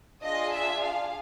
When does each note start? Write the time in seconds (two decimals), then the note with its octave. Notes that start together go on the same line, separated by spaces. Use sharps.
0.24 D4 F4 G#4 D#5
0.53 E5
0.83 F5